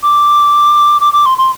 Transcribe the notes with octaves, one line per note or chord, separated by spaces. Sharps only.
D6
D6
D6
C6
C6